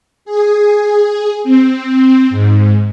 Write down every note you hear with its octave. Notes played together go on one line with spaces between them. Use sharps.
G#4
C4
G#2